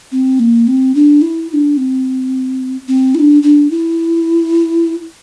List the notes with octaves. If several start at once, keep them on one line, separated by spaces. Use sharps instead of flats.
C4
A#3
C4
D4
E4
E4
D4
C4
C4
E4
D4
D4
E4